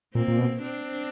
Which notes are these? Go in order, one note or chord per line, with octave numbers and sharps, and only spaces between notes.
A#2 A#3 C4
A#2
B2
C4 D4